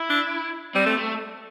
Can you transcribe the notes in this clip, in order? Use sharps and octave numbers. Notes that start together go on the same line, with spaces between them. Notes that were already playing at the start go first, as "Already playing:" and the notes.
Already playing: E4
D4
G3 C4
A3
A3